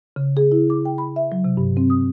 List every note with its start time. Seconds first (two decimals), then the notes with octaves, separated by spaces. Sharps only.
0.16 C#3
0.37 G#4
0.52 E4
0.70 D6
0.85 G5
0.98 B5
1.16 E5
1.32 F#3
1.44 C3
1.57 G2
1.77 C4
1.90 D#6